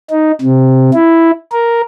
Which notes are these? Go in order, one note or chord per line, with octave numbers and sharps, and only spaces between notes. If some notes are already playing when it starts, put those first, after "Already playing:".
D#4
C3
E4
A#4